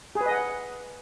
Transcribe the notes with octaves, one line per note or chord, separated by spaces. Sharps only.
G#4
B4
D#5
F#5